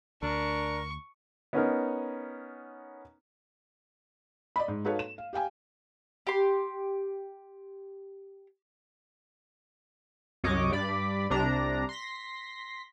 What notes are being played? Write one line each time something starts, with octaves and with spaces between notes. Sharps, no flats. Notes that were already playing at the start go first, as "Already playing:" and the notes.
D2 D4 A#4 C#6
B3 C#4 D#4 A#4
D5 D#5 B5
G#2
D#4 F#4 A4 B4 C#5 F5
E7
F5
G4 F5 G5 G#5
G4 C6
C2 F#2 C#5 D#5 D6
G2 D5 B5
C2 C3 D4 A#5
C6 A#6 B6